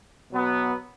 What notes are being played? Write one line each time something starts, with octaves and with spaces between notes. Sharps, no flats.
B2 F#3 B3